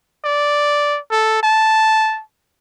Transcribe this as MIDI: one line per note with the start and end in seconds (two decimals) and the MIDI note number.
0.24 0.99 74
1.11 1.39 69
1.43 2.22 81